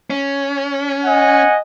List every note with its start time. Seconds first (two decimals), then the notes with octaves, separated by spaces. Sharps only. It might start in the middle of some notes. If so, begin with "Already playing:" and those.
0.10 C#4
1.05 D#5 F#5 G#5